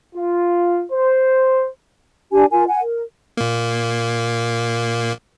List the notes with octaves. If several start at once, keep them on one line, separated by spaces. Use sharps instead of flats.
F4
C5
D4 G4 G#5
F4 A#4 G#5
F#5 G#5
A#4
A#2 A#3